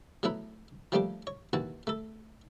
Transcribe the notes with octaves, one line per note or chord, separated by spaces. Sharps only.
F#3 A3 B3 E4 B4
F3 G3 A3 A#3 D4 G4
C#5
D#2 E3 F#4 A5
A3 A4